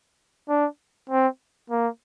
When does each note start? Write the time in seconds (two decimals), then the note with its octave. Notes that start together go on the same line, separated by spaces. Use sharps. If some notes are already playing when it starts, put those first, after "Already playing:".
0.49 D4
1.10 C4
1.70 A#3